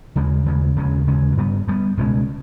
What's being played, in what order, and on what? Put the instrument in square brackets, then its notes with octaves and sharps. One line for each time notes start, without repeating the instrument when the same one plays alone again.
[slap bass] D#2 C#3 G#3
D#2 C#3 G#3
D#2 C#3 G#3 C#4
D#2 C#3 G#3 C#4
G2 G3 B3
G2 G3 B3
C#2 B2 G#3 C#4